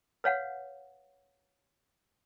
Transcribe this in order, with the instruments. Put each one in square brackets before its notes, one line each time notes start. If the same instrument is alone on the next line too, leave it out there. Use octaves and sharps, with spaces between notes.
[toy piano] B4 C#5 F5 F#5